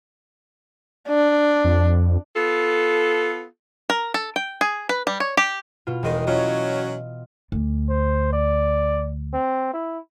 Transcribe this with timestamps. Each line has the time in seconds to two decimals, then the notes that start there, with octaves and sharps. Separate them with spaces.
1.09 D4
1.64 F2
2.35 B3 F4 A4
3.90 A#4
4.14 A4
4.36 G5
4.61 G#4
4.89 B4
5.07 G3
5.20 C#5
5.37 G4
5.87 B2 F4
6.03 E1 D#3 G#3 D#5
6.27 F#3 C#4 F4
7.52 D2
7.89 C5
8.33 D5
9.33 C4
9.73 E4